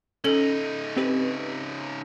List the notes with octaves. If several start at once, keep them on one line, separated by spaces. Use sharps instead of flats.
C#3 C#4 D#4 A4 F#7
C4 G4 B4